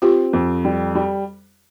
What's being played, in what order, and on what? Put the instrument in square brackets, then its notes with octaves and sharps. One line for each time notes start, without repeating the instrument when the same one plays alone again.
[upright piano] C4 [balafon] F4 G4
[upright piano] F2
G3
G3